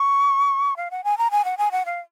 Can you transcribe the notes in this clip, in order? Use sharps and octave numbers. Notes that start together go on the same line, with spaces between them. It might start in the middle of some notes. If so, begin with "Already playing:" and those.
Already playing: C#6
F5
F#5
G#5
A#5
G#5
F#5
G#5
F#5
F5